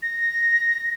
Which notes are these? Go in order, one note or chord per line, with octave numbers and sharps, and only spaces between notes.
A#6